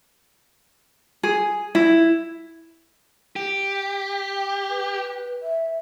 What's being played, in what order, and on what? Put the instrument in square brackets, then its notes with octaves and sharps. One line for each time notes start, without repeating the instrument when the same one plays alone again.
[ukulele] G#4
E4
[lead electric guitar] G4
[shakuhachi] B4
E5